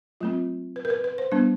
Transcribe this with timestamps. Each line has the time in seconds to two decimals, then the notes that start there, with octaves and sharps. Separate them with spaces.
0.21 F#3 A3 C4 F4
0.76 B4
0.85 A#4
0.90 B4
1.04 B4
1.18 C5
1.32 G3 B3 D4